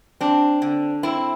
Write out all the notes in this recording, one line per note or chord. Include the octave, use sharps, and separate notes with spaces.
C4 D4
D3
C4 E4